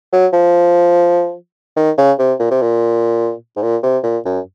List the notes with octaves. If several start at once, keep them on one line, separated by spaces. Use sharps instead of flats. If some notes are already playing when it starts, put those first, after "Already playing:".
F#3
F3
D#3
C#3
C3
A#2
C3
A#2
G#2
A#2
C3
A#2
F#2